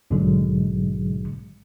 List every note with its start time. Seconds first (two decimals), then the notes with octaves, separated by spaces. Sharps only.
0.11 A#1 G#2 B2 D3 F#3 G#3